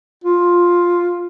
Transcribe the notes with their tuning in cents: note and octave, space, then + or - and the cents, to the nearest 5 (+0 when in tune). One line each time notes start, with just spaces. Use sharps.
F4 +5